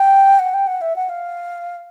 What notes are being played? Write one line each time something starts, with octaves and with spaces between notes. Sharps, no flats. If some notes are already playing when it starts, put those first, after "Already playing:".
Already playing: G5
F#5
G5
F#5
E5
F#5
F5